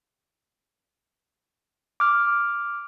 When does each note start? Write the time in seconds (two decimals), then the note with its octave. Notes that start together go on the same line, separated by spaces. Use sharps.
2.00 D6 F6